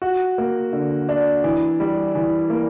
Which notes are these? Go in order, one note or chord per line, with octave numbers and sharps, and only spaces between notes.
F#4
A#3
D3
D4
E3
G3
E3
A#3